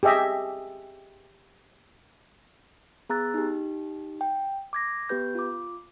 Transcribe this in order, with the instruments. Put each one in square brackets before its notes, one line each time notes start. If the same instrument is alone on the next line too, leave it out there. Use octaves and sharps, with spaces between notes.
[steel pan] G4 G#4 D#5 E5
[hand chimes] B3 G#4 A#5 E6 F#6 A6
D#4 G4
G5
D6 G#6 A#6
B3 G4 B4 G6
F4 D6